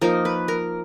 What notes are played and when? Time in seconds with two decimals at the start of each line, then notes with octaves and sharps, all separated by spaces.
0.01 F3 A#3 D#4 A#4
0.25 B4
0.48 A#4